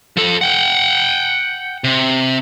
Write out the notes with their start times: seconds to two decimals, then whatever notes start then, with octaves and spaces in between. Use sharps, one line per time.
0.17 F3 A4
0.41 F#5 G5
1.84 C3